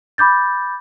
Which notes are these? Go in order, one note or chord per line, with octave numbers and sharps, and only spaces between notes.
B5 D6 G6 A6